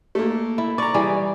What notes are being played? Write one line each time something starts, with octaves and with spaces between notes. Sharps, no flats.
A3 A#3
E4
D5 A#5 C#6
E3 G3 G#4 D5